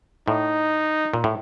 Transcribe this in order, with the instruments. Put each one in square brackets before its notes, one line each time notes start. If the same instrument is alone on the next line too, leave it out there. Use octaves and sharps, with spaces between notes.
[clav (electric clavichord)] A2 [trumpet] D#4
[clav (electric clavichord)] A#2
A2